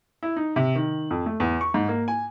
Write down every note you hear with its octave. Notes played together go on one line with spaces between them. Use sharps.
E4
D#4
C3
D#3
F2
A3
E2
C#6
G#2
A#3
G#5